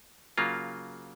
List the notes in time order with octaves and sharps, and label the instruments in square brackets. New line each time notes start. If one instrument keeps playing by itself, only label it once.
[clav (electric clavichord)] C#3 F#3 A#3 F4